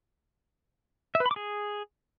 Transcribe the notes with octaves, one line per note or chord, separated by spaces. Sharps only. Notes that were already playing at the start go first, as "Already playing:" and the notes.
E5
B4
B5
D6
G#4